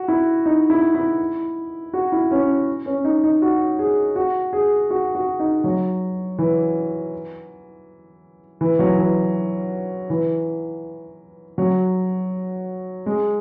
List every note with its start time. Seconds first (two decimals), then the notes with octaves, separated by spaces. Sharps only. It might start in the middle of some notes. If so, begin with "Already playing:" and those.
Already playing: F#4
0.08 E4
0.46 D#4
0.70 E4
0.94 E4
1.94 F#4
2.12 E4
2.31 C#4
2.86 C#4
3.05 D#4
3.24 D#4
3.42 F#4
3.79 G#4
4.16 F#4
4.53 G#4
4.90 F#4
5.15 F#4
5.40 D#4
5.64 F#3
6.38 E3
8.61 E3
8.79 F#3
8.98 E3
10.10 E3
11.58 F#3
13.06 G#3